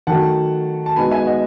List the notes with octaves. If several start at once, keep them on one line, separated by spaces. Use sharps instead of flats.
D#3 F#3 A3 F#5 A5
A5
B2 G#3 B3 D#4 G#5 B5
E5 G#5
G#5
D#5 F#5